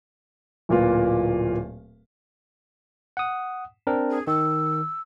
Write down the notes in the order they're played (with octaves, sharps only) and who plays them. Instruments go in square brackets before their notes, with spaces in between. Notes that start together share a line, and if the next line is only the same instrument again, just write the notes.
[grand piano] D1 A#2 A#3 F4 B4
[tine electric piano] F#5 D#6
C4 D4 A#4
[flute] G#4
[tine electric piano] D#3 [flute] E6